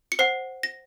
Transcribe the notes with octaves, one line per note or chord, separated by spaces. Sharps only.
C#7
C5 F#5 C7
A#6